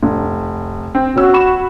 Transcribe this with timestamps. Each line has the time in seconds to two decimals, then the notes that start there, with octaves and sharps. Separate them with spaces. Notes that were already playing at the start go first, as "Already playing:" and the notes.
0.03 F1
0.95 C4
1.16 B2 C#4 F#4 E6
1.34 B5 C#6 E7